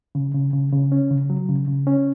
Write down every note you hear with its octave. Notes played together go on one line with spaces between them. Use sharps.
C#3
C#3
C#3
C#3
C#4
C#3
F#3
C#3
C#3
C#4